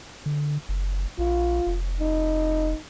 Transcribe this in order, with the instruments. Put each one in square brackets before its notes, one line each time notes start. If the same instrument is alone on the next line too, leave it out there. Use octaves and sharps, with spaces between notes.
[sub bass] D3
F#1
[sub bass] A#1 [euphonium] F4
[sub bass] F1
[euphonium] D#4